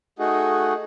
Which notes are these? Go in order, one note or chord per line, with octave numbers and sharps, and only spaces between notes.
A3 D#4 F#4 G#4